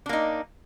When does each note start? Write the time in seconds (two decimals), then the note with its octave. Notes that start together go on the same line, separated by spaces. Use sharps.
0.06 D4
0.09 A#3
0.13 D#4